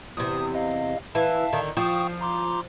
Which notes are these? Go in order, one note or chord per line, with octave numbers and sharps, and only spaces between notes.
E2 C3 D#6
D#5 F5
E3 E5 F5 A5
D3 D#3
F3 G5 C#6 D#6
A#5 C6 D6